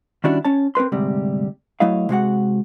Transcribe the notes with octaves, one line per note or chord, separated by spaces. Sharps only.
D#3 G3 C#4 D4 E4 F#4
C#4 C#5 A5
C4 A#4 B4 C6
D2 G#2 C3 G3
F#3 A3 E4 D#5 F5
C3 G#3 F#4 F#5